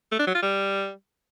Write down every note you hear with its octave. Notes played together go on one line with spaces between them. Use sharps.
A3
D4
F#3
F4
G3